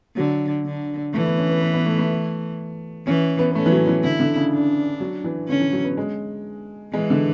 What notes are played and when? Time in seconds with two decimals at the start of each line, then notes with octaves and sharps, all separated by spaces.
0.16 D3 F#3
0.65 D3
1.14 E3 A3
1.26 B3
1.38 C#4
1.50 B3
1.61 B3
1.74 B3
1.86 A3
1.98 A3
3.06 E3 C#4
3.39 B3
3.51 B3
3.55 A3 C#4
3.66 E3
3.72 F#3
3.87 E3
4.04 D3 E4
4.20 D3
4.36 C#3
4.52 D4
5.00 F#3
5.24 E3
5.48 D3 C#4
5.60 E3
5.72 F#3
5.84 B3
5.97 G#3
6.93 E3 G#3
7.10 D3